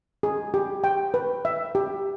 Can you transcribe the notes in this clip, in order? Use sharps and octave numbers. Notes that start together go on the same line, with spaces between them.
G#4
G4
G5
B4
E5
G4